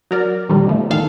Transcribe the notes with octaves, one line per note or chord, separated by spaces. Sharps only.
F#3 A#4 D5
A#2 D3 D#3 F3 G3
B2 F3 A3
A1 D#2 D#3 E3 A4 F5